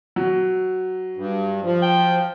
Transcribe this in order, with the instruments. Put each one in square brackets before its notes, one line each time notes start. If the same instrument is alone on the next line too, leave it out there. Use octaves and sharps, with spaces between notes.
[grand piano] F#3
[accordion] G2
F3
[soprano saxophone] G5